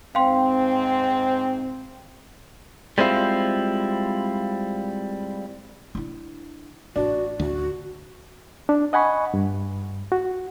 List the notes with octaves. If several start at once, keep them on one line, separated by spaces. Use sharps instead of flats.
G#2 C4 F5 G5 C6
G3 G#3 C4 E4 F4
D4 E4
A1 D4 F#4
D2 F#4
D4
D#5 F#5 G#5 B5 C#6
G2
F#4